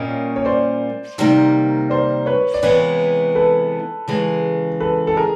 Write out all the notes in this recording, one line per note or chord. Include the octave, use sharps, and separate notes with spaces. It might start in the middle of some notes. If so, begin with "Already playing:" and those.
Already playing: A#2 G3 A#3 C#4 C#5 D#5
C#5
C5 D5
C3 D#3 G3 A#3
C5 D5
B4 C#5
D5
C3 E3 G#3 B3 E4 B4 C#5
A4 B4
C#3 E3 G#3
A4 B4
A4
G#4 A#4